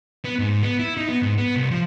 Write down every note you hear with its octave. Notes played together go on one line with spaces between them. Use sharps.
B3
G#2
B3
E4
D#4
B3
G#2
B3
C2
F3